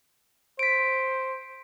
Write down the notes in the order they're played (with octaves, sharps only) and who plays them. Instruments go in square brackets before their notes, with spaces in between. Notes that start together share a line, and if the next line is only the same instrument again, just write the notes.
[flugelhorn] C5 [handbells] B6 D7